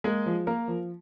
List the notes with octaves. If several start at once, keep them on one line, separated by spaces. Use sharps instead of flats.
G#3 A#3 G#4
F3
A#3 A#4
F3